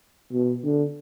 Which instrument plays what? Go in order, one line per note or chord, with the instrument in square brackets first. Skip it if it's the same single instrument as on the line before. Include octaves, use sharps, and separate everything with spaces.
[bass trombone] B2
D3